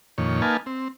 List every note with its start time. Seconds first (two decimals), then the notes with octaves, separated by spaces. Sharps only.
0.18 F2 A#2 D#3 C#5
0.42 A#3 D#4 B4 F5 G#5 A5
0.66 C4